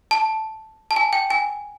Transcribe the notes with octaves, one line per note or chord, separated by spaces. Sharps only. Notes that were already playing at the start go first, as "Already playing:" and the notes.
A5
A5
G#5
G5
G#5